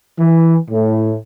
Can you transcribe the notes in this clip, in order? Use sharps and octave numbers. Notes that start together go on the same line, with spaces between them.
E3
A2